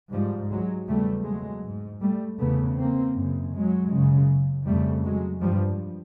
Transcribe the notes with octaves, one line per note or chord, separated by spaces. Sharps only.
G#2 F3 G3
F#3 G#3
E2 C#3 G3 A3
F#3 G#3
G#2
G3 A3
E2 C#3 A3 B3
A#3 C4
F#2 C#3
F#3 G#3
F#2 C#3
F2 C#3 G3 A3
F#3 G#3
G2 F3 G3